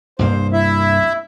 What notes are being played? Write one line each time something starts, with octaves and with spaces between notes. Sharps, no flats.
C2 G2 A#3 C5
E4 E5